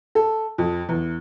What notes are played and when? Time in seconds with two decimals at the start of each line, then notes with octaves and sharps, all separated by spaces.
0.15 A4
0.58 F2
0.89 E2